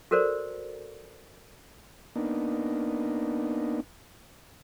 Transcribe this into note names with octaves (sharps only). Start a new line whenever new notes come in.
F#4 A4 A#4 C5 D5
A#3 B3 D4 D#4